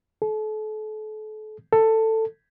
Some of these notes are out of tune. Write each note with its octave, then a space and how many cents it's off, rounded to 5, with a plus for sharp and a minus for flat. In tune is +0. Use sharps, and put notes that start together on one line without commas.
A4 -35
A4 +15